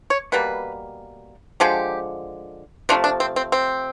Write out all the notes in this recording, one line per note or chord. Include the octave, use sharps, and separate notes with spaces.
C#5
B2 G3 A#3 B4
D3 F3 G#3 G4
C3 F3 A3 D4
D4
C4
C4
C4